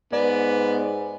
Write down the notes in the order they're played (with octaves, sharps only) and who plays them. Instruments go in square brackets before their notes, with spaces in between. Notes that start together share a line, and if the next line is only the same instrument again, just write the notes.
[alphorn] G#2 [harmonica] B3 [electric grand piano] D5